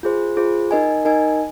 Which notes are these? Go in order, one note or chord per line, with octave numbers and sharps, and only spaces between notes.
F4 G#4 C5
F4 G#4 C5
D#4 A#4 D#5 G#5
D#4 A#4 D#5 G#5